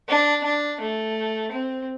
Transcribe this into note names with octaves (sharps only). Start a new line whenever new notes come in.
D4
D4
A3
C4